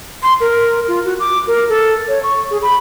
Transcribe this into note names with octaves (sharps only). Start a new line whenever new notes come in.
C6
A#4
F4
F#4
D6
A#4
A4
C#5
C#6
G#4
B5